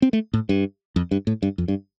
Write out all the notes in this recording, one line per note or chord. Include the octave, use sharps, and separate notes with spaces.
C4
A3
A2
G2
F2
G2
A2
G2
F2
G2